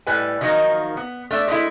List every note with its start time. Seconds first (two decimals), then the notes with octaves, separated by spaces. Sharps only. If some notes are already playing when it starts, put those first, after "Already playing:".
0.07 A2 G3 B4 G#5
0.41 D#3 F3 F#3 A#3 D#4
0.97 B3
1.31 A3 D4 E5
1.48 G#3 A3 E4